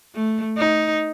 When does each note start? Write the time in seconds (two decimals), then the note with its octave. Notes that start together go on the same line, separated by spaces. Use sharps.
0.15 A3
0.57 D#4